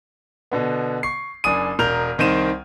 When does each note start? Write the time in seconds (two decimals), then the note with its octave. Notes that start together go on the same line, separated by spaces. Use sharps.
0.52 B2 D3 B3
1.03 C#6 C7
1.44 F#1 D4 G#5 D#6 D#7
1.79 E1 A#4 F6 G6 F7
2.18 C2 D#3 C4 C5 D#7 E7